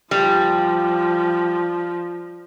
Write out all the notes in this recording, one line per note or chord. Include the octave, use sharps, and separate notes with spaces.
F3 G3